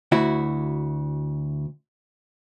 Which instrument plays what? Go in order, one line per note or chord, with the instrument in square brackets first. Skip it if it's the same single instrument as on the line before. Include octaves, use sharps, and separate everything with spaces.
[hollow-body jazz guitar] D2 E4 F#4